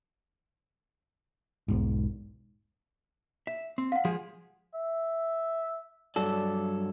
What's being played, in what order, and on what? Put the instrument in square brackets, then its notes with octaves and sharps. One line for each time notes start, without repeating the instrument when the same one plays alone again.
[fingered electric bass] E1 B1 G#2
[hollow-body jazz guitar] E5
C4
[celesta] F5 F#5
[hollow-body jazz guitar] F3 G#3 G#4
[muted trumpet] E5
[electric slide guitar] G2 F#3 A4 [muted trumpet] D5